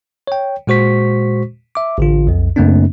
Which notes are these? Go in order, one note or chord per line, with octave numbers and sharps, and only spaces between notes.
C#5 G5
A#2 G#3 F#4 C5 C#6 B6
E5 D6
A1 D3 F4
B1 F2
F#2 C#3 A3 A#3 C4 D4